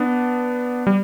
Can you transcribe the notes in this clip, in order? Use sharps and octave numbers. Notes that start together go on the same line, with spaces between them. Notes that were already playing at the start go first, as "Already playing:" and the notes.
Already playing: B3 D4
G3